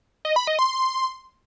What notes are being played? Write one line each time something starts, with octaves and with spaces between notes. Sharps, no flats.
D#5
B5
D#5
C6